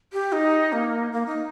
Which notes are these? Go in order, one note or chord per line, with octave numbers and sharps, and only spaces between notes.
G4
D#4
A#3
A#3
D#4